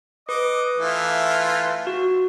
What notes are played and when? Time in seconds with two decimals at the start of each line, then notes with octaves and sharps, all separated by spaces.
0.29 B4 D#5 D6
0.78 E3 A3 F4
1.87 F#4